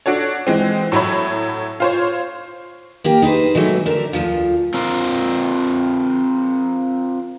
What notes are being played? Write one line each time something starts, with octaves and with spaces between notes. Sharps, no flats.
D4 F#4 A4 C#5
E3 G#3 C4
A2 F#3 E4 C#5 B5
F4 C5 C#5
A#3 G4 A#4 G5
D#4 G#4 B4 C5
E3 F#3 G#3 A3
D3 A#4 E5
D2 F3 F4
C4 F4 A#4